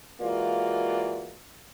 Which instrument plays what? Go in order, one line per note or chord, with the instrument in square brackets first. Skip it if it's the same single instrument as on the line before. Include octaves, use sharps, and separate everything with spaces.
[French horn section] E3 G#3 A#3 F4 F#4 D5